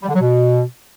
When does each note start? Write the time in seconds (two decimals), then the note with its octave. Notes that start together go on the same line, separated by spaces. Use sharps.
0.03 G3
0.09 D3
0.15 F#3
0.21 B2